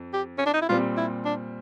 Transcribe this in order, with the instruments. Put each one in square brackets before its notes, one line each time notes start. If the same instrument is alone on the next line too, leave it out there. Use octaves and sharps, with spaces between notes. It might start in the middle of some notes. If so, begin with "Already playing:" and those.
Already playing: [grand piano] F2
[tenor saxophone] G4
C#4
D4
D#4
E4
[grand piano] A#2 G3 C4 [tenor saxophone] F4
[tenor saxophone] E4
D4